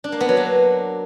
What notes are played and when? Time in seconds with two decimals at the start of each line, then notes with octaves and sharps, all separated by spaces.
0.04 D4
0.12 A#3
0.21 B3
0.29 F#3
0.37 A#3